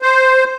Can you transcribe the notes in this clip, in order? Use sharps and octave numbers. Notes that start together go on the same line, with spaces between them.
C5